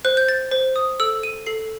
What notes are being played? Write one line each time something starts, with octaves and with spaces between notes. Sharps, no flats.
C5 F#6
G6
A6
C5
D#6
A4 E6
D#7
A4 C7